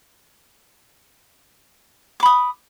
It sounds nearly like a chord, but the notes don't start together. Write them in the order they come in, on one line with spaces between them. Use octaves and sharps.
D6 B5 D#6